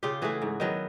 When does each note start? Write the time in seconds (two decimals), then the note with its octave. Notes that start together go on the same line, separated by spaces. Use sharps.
0.03 C#3 F4 G4
0.22 E3 A3 F#4 G#4
0.42 G#2
0.60 D#3 F#3 B3